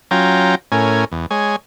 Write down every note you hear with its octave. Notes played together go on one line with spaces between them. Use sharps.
F#3 C#4 F4 G5 A#5
A2 C#4 A#4 G#5
E2
G#3 C#5 G#5